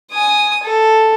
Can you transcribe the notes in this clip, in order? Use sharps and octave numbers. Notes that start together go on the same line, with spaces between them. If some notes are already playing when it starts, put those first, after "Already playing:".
G#5 D#6
A4